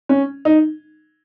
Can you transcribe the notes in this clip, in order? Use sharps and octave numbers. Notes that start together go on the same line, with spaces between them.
C#4
D#4